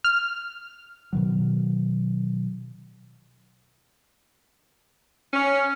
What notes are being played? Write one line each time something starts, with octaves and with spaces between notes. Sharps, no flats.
F6
B2 D#3 F#3
C#4